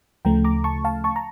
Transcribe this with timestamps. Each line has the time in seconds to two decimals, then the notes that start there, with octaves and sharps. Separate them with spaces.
0.25 D2 C#3 F3 A3 G5 A#5
0.45 A#5 D6
0.64 A5 C#6
0.85 F5 A5
1.04 A5 C#6
1.16 A#5